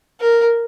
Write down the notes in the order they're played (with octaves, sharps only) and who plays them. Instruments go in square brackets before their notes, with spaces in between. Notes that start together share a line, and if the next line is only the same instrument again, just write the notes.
[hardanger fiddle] A#4